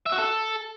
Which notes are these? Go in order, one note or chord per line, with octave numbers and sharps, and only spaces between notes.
E5
F#4
A4